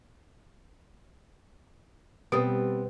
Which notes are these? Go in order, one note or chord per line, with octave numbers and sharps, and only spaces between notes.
B2 G3 B3 C4 D#6